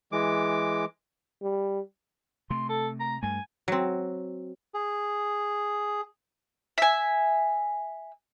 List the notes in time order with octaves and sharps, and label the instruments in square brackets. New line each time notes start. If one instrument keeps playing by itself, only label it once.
[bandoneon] E3 G#3 D6
[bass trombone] G3
[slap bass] C3 A3 [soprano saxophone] C6
[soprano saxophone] A4
A#5
[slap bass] G2 A3 [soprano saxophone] G#5
[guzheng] F#3 C4
[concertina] G#4
[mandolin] E5 G#5